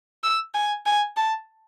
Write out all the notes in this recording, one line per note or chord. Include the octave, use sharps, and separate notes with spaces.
E6
G#5
G#5
A5